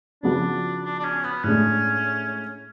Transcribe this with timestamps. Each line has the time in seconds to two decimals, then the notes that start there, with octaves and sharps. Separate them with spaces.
0.23 C#3 F3 B3 D4 F#4
0.84 D4
1.00 D4
1.04 C#4
1.24 B3
1.43 A2 G#3 C#4 D4